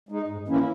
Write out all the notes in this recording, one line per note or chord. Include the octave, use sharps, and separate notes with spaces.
G#3 D#4
G#2
E3 A#3 C#4 E4